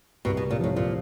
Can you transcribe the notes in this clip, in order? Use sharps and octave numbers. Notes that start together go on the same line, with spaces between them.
C2 B2
B2
C3
A#2
A2 F3
A#2 F3